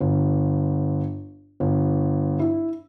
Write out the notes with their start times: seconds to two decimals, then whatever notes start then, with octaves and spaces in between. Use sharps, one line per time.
0.01 G1
1.60 G1
2.39 E4